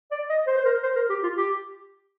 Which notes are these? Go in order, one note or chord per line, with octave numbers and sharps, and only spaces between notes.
D5
D#5
C5
C5
A#4
C5
A#4
G4
F4
G4